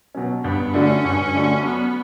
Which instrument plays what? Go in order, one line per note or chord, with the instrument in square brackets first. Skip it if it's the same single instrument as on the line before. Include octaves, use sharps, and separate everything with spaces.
[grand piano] B2 F#3 C#4
[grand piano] G2 [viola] B3
[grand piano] D3 A3 D4 F#4 [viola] C#4
[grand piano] G2
D3 A3 D4 F#4
[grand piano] F#3 [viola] B3